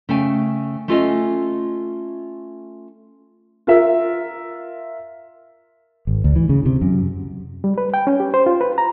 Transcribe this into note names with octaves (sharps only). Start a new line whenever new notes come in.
C#3 A3 G5 G#5
A3 C#4 F4 A4 D#5 G#5
F4 A#4 E5
G#1
D2
E3
C#3
C3
F#2
G3
B4
G5
C#4
G4
C5
F4
B4
A#5